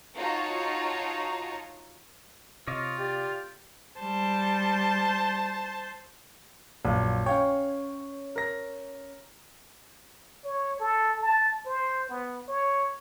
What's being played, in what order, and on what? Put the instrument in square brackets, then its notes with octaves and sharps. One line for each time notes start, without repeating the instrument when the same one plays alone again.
[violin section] D#4 F4 F#4 C#5 A5 A#5
[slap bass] C3 [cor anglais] F4 [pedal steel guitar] C#5 D#5 D6
[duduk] G4 [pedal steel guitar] D5
[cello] G3 [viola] C5 A5
[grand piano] A#1 F#2 F5
[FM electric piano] C#4 C#5 [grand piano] F5 G5
[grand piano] A#4 A#6
[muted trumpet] C#5
A4
A5
C5
B3
C#5